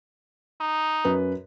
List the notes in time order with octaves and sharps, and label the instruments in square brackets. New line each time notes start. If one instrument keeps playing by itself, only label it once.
[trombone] D#4
[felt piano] F#2 B4